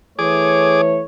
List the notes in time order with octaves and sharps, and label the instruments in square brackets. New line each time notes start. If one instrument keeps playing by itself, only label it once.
[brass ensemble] E3 A3 C#5 [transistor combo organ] G#4 D6